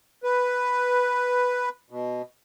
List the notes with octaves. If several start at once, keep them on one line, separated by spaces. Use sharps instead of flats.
B4
B2